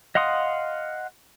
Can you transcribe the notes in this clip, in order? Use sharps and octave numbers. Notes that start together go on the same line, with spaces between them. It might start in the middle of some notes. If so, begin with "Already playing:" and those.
D#5 F5 F#5 C6 D#6